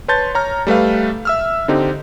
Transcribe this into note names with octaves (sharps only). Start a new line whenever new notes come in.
B4 C#5 A5 C6 G6 A6
C#5 A#5 F6
G3 A3 B4 F5
E5 E6 F6
D3 C4 D#4 G4